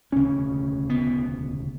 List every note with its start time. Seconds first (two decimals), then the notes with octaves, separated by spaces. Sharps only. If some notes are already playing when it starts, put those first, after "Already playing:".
0.12 E1 D2 C#3 C#4
0.90 B3